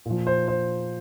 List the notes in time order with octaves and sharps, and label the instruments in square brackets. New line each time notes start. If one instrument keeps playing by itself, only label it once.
[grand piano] A#2 F3
C5
C5